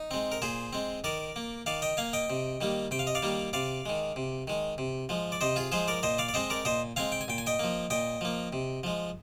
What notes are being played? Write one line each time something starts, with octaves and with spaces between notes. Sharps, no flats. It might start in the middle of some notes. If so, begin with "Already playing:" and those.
Already playing: D#4
G#3 C4
A#4
A#2 G#4 C5
G#3 C4
D#3 A#4 D5
A#3
D#3 D5 F5
D#5 G5
A#3 F5 G#5
D#5 G5
C3
D#3 G3 A#3
C3 G5
F5
D#5
D5 F5
D#3 G3 A#3
C3 D5 F5
D#3 G#3
C3
D#3 G#3
C3
F3 G#3
D5
C3 C5 D#5
F4 G#4
F3 G#3 G#4 C5
A#4 D5
A#2 C5 D#5
D5 F5
D5
G#3 C4 C5 D#5
A#4 D5
A#2 C5 D#5
G#3 C4 F5 G#5
G5
G#5
A#2 G5
G#5
D#5 G5
F3 A#3
A#2 D#5 G5
F3 A#3
C3
F3 G#3